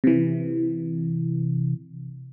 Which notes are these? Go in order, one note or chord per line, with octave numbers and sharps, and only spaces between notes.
C3 E3